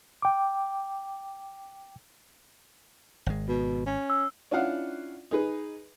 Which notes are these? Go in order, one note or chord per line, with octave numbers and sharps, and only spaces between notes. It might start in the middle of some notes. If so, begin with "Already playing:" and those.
G5 D6
G#1 G#3
B2
C#4
E6
C#4 D4 E4 F4 F5 F#5
D#4 G#4 B4